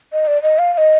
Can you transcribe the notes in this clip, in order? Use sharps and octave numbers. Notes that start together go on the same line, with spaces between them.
D#5
D5
D#5
F5
F5
D#5